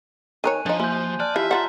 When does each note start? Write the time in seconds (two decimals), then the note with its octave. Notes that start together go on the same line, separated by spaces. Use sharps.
0.44 D#3 A#4 C#5 G#5 F#6 D#7
0.66 F3 D4 D#4
0.80 A#3 E4 G#5 C6 G6
1.20 D5 A5 F6 F#6
1.36 E3 F4 G4 E5 E6
1.51 F4 D5 F#5 A#5 C6